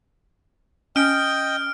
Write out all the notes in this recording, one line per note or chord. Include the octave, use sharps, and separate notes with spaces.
C#4 D#5 G5 F6 D7